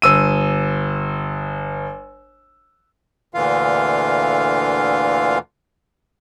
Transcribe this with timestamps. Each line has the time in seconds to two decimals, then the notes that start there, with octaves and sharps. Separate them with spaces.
0.02 G1 E6 D#7
3.35 D2 A#2 D3 E3 F4 F5